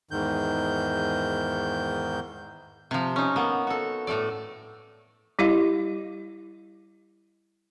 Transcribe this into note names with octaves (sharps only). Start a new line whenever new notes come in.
E2 G#2 D#3 G6
C3 F3
C#4 D#4
A#3 B3
F#4 A4
A2 A3 A4 D5
G3 E4 G4 D#5 F5